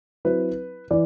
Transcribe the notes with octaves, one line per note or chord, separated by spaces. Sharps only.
F#3 C4 E4 B4
E3 D5